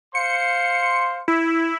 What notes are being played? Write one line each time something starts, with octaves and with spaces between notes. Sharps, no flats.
C5 F5 C6 C#7
E4